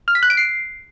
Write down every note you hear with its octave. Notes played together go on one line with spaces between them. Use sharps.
F6
B6
F#6
D7
C7